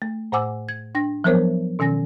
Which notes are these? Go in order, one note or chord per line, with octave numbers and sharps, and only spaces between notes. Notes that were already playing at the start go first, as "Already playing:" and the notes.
A3
A2 C5 F#5 G#5 D6 E6
G#6
D4 G5 A#6
F3 F#3 B3 A#4 C5 C#5
B2 D#3 C#4 G#5 A#6